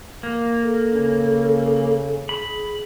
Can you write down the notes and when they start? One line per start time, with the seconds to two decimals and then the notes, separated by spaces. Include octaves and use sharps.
0.23 A#3
0.63 A4
0.94 C#3
2.29 G#4 B5